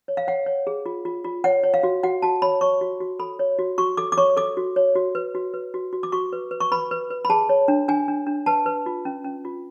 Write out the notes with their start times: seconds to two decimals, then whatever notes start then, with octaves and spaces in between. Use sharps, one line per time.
0.08 C#5
0.17 F5
0.27 C#5 F#5
0.46 C#5
0.67 G#4
0.86 F4
1.05 F4
1.24 F4
1.44 C#5 F#5
1.63 C#5
1.74 F5
1.83 F#4
2.03 F#4 F#5
2.22 F#4 A5
2.42 C#5 B5
2.61 C#5 C#6
2.81 F#4
3.01 F#4
3.19 A4 B5
3.39 C#5
3.59 F#4
3.78 F#4 C#6
3.97 A4 D6
4.12 D6
4.17 C#5 C#6
4.37 A4 D6
4.57 F#4
4.76 C#5
4.95 F#4
5.15 B4
5.35 F#4
5.54 B4
5.74 F#4
5.93 F#4
6.03 D6
6.12 F#4 C#6
6.33 B4
6.51 B4
6.61 C#6
6.72 B4 B5
6.91 B4
7.10 B4
7.25 B5
7.30 G#4 A5
7.49 C#5
7.68 D4
7.88 D4 G#5
8.08 D4
8.27 D4
8.46 B4 A5
8.66 B4
8.86 F4
9.05 C#4
9.24 C#4
9.45 F4